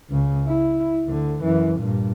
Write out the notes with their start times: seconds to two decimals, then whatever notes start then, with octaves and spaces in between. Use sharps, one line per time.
0.10 C#2 C#3
0.47 E4
1.06 D2 D3
1.43 F#2 E3
1.80 G2 A#2